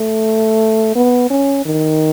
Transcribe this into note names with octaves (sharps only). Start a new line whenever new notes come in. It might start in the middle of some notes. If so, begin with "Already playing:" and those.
Already playing: A3
B3
C#4
D#3